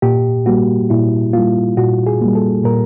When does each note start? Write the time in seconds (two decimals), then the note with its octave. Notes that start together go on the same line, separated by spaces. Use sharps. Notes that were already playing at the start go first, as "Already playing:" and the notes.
0.02 A#2 G4
0.46 G3 A#3 F#4
0.90 A#2 E4
1.33 G3 A#3 F4
1.77 A#2 F#4
2.07 G#4
2.21 G3 A#3
2.35 A4
2.64 A#2 A#4